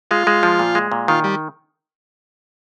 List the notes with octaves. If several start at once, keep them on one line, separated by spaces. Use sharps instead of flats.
G#3 F4
G#3
F3
A#2
G#3
A#2
D#3 F4
G3